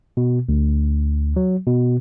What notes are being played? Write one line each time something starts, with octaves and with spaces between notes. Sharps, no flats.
B2
D2
F#3
B2